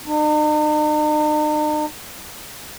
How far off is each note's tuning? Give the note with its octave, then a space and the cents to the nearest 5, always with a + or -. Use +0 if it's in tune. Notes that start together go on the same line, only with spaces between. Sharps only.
D#4 -45